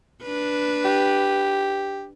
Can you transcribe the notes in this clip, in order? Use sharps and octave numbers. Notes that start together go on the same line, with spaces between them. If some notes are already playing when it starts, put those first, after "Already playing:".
D4 B4
G4